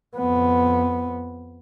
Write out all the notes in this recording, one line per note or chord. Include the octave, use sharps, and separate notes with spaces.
F2 B3